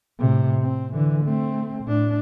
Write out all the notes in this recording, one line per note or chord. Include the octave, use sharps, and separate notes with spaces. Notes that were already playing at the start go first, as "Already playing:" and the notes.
A2 C3
C4
D3 E3
A3 C4
A2 D4